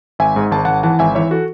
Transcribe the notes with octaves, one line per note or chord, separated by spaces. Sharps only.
G#1 E5 G#5
G#2
G#1 A5
G#1 F#5 A5
E3 F#5 A5
G#1 E5 G#5
E3 C#5 E5
F#4 A4